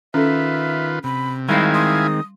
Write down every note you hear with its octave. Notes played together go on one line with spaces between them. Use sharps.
D#3 C#4 F4 A4 B4 E5
C3 B5
D#3 G3 G#3 C4 E4 F5 G#5 B5
C6 D#6